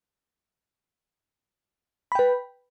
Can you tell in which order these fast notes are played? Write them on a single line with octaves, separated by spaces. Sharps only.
B5 G5 B4